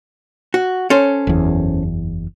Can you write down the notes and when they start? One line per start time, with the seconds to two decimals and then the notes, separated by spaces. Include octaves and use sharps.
0.54 F#4
0.90 C#4 A4 C5
1.27 F#1 E2